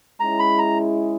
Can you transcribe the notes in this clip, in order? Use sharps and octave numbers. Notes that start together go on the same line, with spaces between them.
G#3 C#4 E4 A#5
B5
A#5